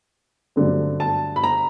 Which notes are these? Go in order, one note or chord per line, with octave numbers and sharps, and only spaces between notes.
G2 D3 F#3 A3 C4
A5
B5
A#5